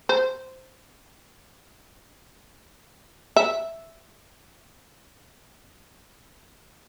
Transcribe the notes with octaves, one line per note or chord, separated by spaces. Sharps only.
C5
E5